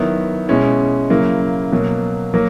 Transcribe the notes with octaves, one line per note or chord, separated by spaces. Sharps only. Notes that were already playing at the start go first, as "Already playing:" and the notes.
Already playing: D#3 F#3 B3 E4
B2 G#3 C#4 E4
C#3 F#3 A#3 E4
B2 F#3 A#3
F#3 A#3